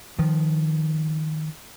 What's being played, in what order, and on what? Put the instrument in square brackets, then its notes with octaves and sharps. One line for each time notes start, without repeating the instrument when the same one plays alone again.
[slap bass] D#3 F3